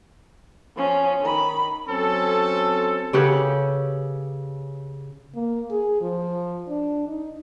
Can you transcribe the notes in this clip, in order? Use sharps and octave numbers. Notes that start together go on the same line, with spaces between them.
F3 C#4
D#3 B5
F#3 C4 C#4 A4
C#3 C#4 G4 A4 B4 F#5
A#3
G#4
F3
D4
D#4